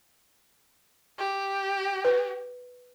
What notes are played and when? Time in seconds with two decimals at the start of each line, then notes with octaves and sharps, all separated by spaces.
1.19 G4
2.05 B4